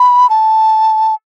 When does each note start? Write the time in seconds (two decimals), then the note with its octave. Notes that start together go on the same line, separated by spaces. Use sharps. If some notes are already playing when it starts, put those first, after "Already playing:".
Already playing: B5
0.30 A5